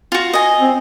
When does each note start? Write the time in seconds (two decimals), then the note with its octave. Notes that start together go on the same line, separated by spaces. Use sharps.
0.12 F4 F#4
0.33 D#5 G#5
0.60 C4